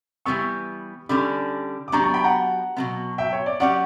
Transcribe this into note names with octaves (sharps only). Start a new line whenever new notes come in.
E3 G3 B3 C#6 E6
D3 G3 C#4 B5 D6
D6
F#3 B3 D4 G4 A#5 C#6
A#5 C#6
G5 B5
F#5 A#5
B2 F#3 B3
E5 G5
C#5
D5
F#3 C#4 G4 D5 F#5